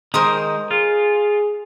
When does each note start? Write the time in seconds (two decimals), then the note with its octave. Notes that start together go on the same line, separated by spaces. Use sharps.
0.14 D#3 G#3 A#4 C5 D#6
0.71 F4 G#4